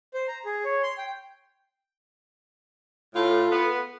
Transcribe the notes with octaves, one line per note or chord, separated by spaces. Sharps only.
C5
A#5
G#4
C#5
C6
G5
A2 F4 A4
B3